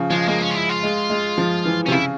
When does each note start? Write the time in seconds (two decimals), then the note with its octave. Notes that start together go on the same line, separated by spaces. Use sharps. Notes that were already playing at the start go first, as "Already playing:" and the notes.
Already playing: C#3 F3
0.10 F3 G#3
0.28 G#3 A#3
0.42 C#4
0.51 F4
0.56 E4
0.69 F4
0.83 G#3
1.10 G#3
1.38 F3
1.65 E3
1.86 C3 C#4
1.92 C#3 E4